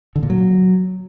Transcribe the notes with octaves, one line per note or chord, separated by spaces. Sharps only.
D3
A#2
F#3